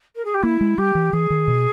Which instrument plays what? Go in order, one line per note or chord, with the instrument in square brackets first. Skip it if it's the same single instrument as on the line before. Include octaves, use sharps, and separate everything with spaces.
[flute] A#4
G#4
G4
[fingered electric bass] A#3 [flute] E4
[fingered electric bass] G#3
[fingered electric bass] G3 [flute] G4
[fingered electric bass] E3
[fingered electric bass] E3 [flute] G#4
[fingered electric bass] D#3
B2